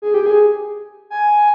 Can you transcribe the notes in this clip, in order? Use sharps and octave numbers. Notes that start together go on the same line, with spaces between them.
G#4
G4
G#4
G#5